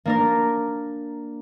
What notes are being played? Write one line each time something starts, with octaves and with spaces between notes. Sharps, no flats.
A#3 D4 A#4